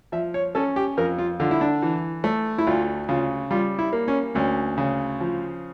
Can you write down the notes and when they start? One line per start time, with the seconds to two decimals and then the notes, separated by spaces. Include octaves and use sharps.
0.12 F3 E5
0.34 C#5
0.55 C#4 A4
0.76 G4
0.97 F2 A#4
1.18 F4
1.40 D3 F4
1.51 E4
1.61 D4
1.82 E3
2.24 A3
2.58 E4
2.67 D2 F4
3.09 C#3 F4
3.51 G3 F4
3.79 E4
3.93 A#3
4.08 C#4
4.35 D2 C#4
4.78 C#3
5.20 F3